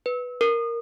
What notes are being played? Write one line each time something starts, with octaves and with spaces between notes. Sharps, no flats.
B4
A#4